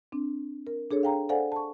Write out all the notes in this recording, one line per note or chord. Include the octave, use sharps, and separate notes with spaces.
C4 D4
A#4
D4 G#4 A4 C#5
F5 G5 A#5
A4 C5 D5 F5 F#5 G#5
A5 C#6